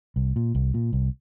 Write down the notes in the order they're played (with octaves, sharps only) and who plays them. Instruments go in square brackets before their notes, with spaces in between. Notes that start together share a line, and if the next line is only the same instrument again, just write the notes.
[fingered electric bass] C2
A#2
C2
A#2
C2